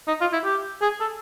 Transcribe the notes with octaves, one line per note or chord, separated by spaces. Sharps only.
D#4
F4
E4
G4
G#4
A4